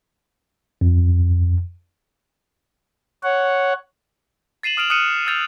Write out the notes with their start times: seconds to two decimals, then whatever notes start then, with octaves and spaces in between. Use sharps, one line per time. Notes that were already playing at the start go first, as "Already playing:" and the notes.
0.81 F2
3.23 C#5 F#5
4.63 A6 C7 D#7 E7 F#7
4.77 D#6 F6 D7 F7 F#7
4.90 D#6 F6 F#6 C#7 D#7 E7
5.26 E6 F6 G6 A6 D#7 F7